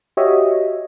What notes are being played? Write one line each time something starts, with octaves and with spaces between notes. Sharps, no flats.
F#4 G4 C#5 D#5 E5